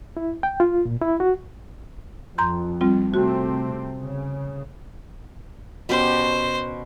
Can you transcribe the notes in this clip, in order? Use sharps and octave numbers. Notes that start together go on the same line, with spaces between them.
E4
G5
F4
A#2
E4
F#4
F2 A#5 C6 G6
G3 C4 F4
C3 A3 C4 F#4
C#3
B2 C#4 G4 C5